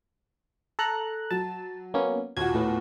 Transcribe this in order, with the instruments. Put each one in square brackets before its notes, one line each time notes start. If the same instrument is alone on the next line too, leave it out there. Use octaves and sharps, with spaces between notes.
[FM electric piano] A4 A#5 F#6
[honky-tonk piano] F#3 [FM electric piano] A5
[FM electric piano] A#3 B3 C#4
[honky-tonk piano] D#2 A#2 F#4 [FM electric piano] G#6
[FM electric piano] A2 B3